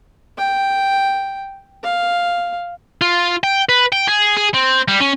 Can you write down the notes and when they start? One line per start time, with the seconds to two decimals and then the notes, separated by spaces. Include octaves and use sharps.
0.37 G5
1.83 F5
3.01 F4
3.43 G5
3.69 B4
3.93 G5
4.08 G#4
4.37 G#4
4.54 C4
4.88 G3
5.00 C#4